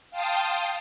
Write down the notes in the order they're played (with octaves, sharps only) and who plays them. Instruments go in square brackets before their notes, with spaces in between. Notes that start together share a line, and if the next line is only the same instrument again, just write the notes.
[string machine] F5 G5 A5 C6 D#6